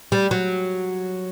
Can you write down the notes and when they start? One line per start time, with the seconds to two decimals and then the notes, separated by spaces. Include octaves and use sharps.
0.12 G3
0.31 F#3